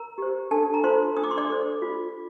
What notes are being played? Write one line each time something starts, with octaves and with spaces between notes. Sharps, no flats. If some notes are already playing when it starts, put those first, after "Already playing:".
Already playing: A#4 A#5
G4 C5
D4 A4 A5
A#5
F4 A4 C5 C6
D4 D#6
D6
C6
D5 D6
A4 C5
F4